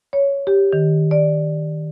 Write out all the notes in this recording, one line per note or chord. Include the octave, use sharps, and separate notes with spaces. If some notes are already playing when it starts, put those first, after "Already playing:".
C#5
G4
D#3
D5